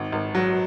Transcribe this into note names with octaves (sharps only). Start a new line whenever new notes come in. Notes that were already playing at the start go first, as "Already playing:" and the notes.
Already playing: G#1
G#1
F#3